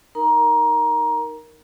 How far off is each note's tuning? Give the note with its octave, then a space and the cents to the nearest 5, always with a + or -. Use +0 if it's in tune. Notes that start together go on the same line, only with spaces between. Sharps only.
D#4 +0 A#4 +0 A#5 +20